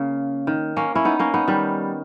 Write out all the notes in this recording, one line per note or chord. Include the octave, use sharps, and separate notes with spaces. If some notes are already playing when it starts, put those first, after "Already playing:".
Already playing: C#3 A#3
D#3
A#3 C#4
C#4 E4
B3 D#4
A#3 C#4
B3 D#4
D#3 G3